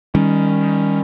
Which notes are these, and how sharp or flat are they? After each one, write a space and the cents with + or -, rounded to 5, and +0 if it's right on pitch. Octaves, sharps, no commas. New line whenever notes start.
D#3 +10 G3 +30 C#4 +0